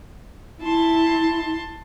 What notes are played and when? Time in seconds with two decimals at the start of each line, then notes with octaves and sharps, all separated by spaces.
0.62 E4 A5 C6